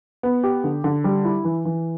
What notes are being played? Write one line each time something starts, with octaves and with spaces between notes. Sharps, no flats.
B3
G4
D3
D3
G3
E4
E3
E3